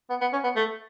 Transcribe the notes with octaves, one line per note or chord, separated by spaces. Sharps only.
B3
B3
C#4
B3
A3